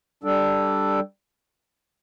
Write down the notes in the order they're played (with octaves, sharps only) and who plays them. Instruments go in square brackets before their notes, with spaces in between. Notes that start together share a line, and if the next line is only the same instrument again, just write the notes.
[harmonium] G3 D4 A4